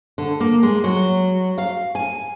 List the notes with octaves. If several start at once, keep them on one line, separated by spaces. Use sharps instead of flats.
D3
A#3
G#3
F#3
F5
G#5